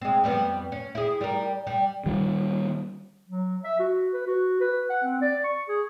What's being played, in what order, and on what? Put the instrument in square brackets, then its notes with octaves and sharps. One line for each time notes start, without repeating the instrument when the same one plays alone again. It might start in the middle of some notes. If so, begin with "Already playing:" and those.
[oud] G#3 C4
F2 G3 B3
C#4
E4 G#4
G3 A#4
G3
[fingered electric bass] D#3 G3
[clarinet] F#3
E5
F#4
B4
F#4
B4
F#5
C4
D5
C#6
G#4